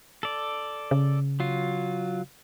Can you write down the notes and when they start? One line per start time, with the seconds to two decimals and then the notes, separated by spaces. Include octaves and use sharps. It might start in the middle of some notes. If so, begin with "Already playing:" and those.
0.23 A4 D5
0.91 C#3
1.40 F#3 F4